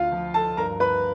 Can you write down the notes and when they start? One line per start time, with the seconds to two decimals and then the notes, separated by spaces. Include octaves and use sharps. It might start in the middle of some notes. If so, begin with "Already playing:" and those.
Already playing: D2 F4 F5
0.12 F3
0.34 A4 A5
0.57 G2 A#4 A#5
0.80 B4 B5